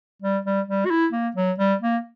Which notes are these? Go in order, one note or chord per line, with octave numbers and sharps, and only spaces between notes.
G3
G3
G3
F#4
E4
A#3
F#3
G3
A#3